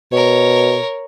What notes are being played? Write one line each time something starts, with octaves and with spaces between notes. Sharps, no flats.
B2 A#4 C#5